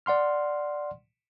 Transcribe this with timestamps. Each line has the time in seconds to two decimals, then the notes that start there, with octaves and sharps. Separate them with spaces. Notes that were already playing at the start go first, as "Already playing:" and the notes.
0.06 D5 F#5 C6 F6